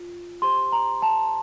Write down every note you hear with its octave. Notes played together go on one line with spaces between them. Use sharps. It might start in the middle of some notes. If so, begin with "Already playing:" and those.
Already playing: F4
G4 C5 C6
A#5
A5